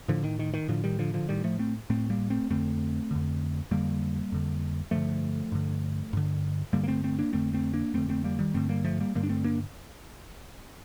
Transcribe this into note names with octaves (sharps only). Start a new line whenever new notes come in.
A2 D3 F3
D#3
D#3
D#3
A2 D3 F3
D#3 G3
D3 F3
D3 F3
A2 D#3 G3
F3 A3
A3 C4
A2 A3 C4
G3 A#3
A3 C4
F2 D3 A3 C4
F2 D3
F2 D3 G3 A#3
F2 D3
G2 D3 F3 A3
G2 D3
G2 D3
G2 D3 G3 A#3
A#3
A3 C4
A3 C4
A#3 D4
F2 D3 A3 C4
A3 C4
A#3 D4
F2 D3 A3 C4
A3 C4
G3 A#3
D#3 G3
G2 D3 A3 C4
G3 A#3
F3 A3
G3 A#3
G2 D3 G3 A#3
D4
A3 C4
A#3 D4